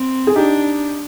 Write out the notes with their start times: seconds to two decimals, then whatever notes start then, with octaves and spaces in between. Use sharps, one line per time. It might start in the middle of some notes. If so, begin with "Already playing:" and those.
Already playing: C4
0.27 G#4
0.36 D4 D#4 G4